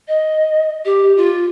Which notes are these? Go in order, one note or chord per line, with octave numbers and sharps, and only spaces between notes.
D#5
G4
F4